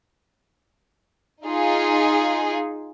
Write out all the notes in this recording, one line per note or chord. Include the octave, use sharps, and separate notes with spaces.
D#4 F4 G#4